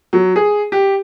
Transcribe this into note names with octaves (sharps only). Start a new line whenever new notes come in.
F#3
G#4
G4